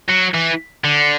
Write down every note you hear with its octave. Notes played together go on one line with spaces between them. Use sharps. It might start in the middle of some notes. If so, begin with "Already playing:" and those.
F#3
E3
D3